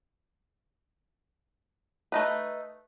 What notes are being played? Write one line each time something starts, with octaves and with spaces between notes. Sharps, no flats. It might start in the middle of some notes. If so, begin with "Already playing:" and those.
A3 D#4 B4